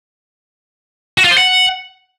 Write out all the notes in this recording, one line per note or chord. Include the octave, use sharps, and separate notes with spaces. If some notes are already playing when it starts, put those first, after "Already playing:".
F#4
F4
C5
F#5